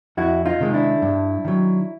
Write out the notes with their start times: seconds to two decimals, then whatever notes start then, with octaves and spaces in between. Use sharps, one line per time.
0.17 F2 E4 F#4
0.46 D#4 F4
0.60 C3 D#3 G#3
0.74 D4 E4
1.02 G2
1.45 D#3 F#3